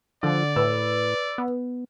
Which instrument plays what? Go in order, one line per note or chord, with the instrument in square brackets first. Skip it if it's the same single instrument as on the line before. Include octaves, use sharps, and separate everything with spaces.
[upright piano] D3 [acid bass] F3 [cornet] D5
[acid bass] A2 [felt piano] B4 [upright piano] E6
[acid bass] B3